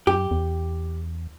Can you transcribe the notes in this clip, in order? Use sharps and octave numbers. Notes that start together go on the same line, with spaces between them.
F#2 G4
E2